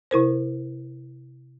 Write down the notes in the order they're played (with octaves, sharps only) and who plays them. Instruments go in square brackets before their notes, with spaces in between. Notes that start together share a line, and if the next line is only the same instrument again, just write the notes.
[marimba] C3 E4 A#4 C5